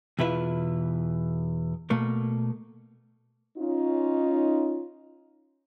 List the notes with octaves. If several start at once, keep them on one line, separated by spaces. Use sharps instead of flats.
E2 B2 E4 F4 B4 E5
B2 A3 A#3
C#4 D#4 F4